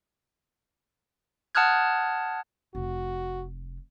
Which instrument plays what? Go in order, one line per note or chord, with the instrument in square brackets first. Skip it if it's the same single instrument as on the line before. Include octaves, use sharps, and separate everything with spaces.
[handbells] F#5 A5 D#6 F6 F#6 G#6
[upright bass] F1 [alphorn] F#4